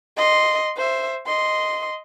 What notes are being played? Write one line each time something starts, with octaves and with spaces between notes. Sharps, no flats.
D#5 C6
C5 E5
D#5 C6